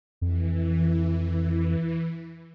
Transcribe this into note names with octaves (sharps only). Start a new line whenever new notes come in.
F2 E3